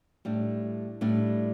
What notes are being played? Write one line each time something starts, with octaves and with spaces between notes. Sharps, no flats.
A2 G3 D4
A2 G3 D4